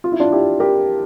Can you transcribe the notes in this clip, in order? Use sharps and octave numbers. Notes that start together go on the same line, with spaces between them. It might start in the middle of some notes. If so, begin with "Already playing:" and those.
F4
E4
D4 F4
E4 G4
G4 A#4